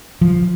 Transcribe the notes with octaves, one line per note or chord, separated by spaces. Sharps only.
F3